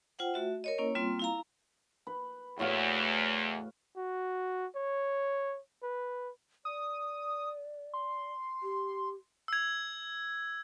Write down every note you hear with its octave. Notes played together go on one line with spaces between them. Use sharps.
F4 C5 F#5 G5
A3 F#4 E5
A#4 C#5 D#5
A#3 C#4 E4 C#5
G3 A#3 C4 F4 C6
E4 F5 A#5
B4
E2 A2 F#4 F5
F#4
C#5
B4
D5 D#6
C6
G4
E6 G#6